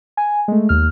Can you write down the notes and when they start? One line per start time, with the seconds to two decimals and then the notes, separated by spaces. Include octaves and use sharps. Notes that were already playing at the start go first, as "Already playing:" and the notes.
0.17 G#5
0.48 G#3 A3
0.69 D#2 F6